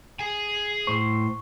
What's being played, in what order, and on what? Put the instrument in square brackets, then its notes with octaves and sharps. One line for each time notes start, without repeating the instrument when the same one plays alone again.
[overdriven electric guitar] G#4 G#5
[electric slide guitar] A2 C5 [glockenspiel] C#6